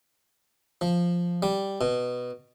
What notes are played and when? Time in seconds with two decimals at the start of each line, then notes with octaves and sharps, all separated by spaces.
0.81 F3
1.43 G3
1.81 B2